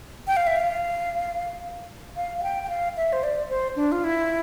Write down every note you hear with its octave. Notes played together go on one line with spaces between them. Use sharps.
G5
F5
E5
F5
F5
F5
G5
G5
F5
E5
C5
D5
C5
D4
F4
E4